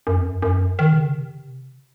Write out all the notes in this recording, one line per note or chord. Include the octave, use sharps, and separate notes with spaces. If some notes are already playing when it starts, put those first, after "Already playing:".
F#2
F2
F#2
F#2
D#3
C3
C#3
C3